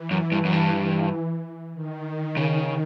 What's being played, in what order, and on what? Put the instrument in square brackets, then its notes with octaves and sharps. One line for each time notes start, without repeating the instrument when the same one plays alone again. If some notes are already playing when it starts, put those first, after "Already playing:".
Already playing: [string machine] E3
[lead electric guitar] F#2
G2
F#2
[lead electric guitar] G2 [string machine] E3
[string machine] D#3
[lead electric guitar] C#3